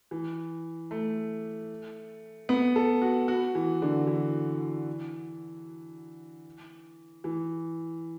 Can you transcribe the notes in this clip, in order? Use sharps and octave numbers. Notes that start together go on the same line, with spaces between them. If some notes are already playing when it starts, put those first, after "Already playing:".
E3
A3
B3
A4
F#4
F#4
E3
D3
E3
E3